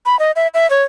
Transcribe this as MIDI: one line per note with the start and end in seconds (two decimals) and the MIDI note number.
0.06 0.18 83
0.19 0.32 75
0.36 0.48 76
0.54 0.69 76
0.70 0.83 73